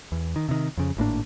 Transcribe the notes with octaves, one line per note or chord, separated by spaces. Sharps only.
E2
D#3
C3 D#3
F2 C#3
G#1 A2 A#3 D4